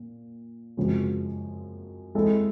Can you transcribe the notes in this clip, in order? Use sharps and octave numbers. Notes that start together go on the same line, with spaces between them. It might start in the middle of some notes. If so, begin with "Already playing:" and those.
Already playing: A#2
F#2 C#3 F3 G#3 C4
G#3 C4 E4 A4